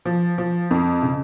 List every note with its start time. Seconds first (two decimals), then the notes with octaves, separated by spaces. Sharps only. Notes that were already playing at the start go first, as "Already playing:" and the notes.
0.05 F3
0.38 F3
0.71 F2
1.02 C#3